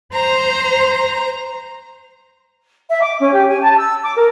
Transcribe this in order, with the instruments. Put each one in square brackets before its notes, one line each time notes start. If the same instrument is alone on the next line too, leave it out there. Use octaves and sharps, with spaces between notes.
[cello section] C5 [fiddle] A#5
[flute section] E5
D6
C#4
G4
G#5
A5
E6
D6
A#4